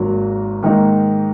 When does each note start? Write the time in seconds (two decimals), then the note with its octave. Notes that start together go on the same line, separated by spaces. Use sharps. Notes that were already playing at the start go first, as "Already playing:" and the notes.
Already playing: G#1 G#2 F#3 A#3
0.63 G#2 D#3 A#3 D#4